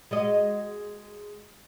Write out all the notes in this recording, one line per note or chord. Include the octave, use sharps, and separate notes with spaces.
G#3 F#4 D#5